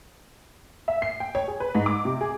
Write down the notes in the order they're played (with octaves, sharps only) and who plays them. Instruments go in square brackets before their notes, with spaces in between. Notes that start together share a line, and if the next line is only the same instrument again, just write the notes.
[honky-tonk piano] E5
C7
G5
C#5
G#4
B4
G#2
D6
C3
G#4